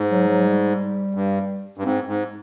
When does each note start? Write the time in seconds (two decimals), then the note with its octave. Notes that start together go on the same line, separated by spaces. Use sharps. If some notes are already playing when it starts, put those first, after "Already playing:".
Already playing: G#2
0.10 F#3
0.28 F#3
0.45 G3
1.14 G2
1.77 G2
1.84 G#2 C4
2.07 G#2